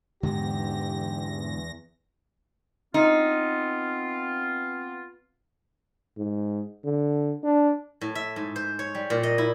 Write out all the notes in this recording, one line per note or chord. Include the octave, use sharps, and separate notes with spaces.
E2 G#2 D3 G#3 B3 G4 A#6
B3 C4 D#4 F4
G#2
D3
D4
A2
E5
G#2
C5
C#5
G3
A#2
D#5
E4